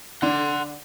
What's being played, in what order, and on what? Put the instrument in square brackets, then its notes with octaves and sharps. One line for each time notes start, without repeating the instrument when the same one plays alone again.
[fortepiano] D3 D4 [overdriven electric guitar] F#5 C6